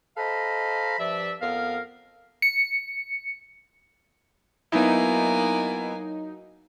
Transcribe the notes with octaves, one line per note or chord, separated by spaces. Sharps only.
A4 C5 D#5 F5 A#5 B5
G2 F3 D5 E5
F2 B3 A#4 F5
C#7
F#3 A#3 B3 D#4 E4 G#5